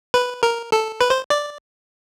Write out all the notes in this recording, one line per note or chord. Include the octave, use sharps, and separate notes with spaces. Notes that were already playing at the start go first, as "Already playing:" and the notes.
B4
A#4
A4
B4
C5
D5